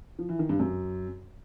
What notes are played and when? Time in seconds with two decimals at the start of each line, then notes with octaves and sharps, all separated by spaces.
0.19 F3
0.29 E3
0.39 D#3
0.49 G2
0.60 F#2